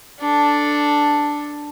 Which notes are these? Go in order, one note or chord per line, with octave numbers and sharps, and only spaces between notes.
D4 A4